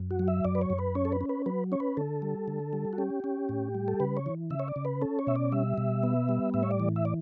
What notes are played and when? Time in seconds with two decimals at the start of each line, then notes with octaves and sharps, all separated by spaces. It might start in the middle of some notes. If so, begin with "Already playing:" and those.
Already playing: F#2
0.11 F#4
0.19 F#3
0.28 E5
0.45 F#2 D5
0.55 B4
0.61 C#5
0.70 F#2
0.79 B4
0.95 C#4 C#5
1.05 A4
1.12 B4
1.21 C#4
1.29 B4
1.46 F#3 B4
1.72 C#4 C#5
1.80 B4
1.97 D3 A4
2.22 G3
2.48 D3
2.73 G3
2.93 F#4
2.98 C#4 G4
3.24 C#4
3.49 A2
3.75 G3
3.88 A4
4.00 C#3 B4
4.17 C#5
4.26 E3
4.50 C#3 E5
4.60 C#5
4.68 D5
4.76 C#3
4.85 B4
5.01 C#4 A4
5.19 C#5
5.27 B2 E5
5.36 D5
5.52 G3 E5
5.78 B2
6.03 B3
6.29 G3
6.54 A2 E5
6.63 C#5
6.71 D5
6.80 E3
6.96 E5
7.05 D5